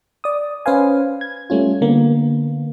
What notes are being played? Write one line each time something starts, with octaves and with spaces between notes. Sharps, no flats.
D5 D#6
C#4 B4 C5 F5 G#5
G#6
G3 A3 C#4 F4
D3 A#3 B3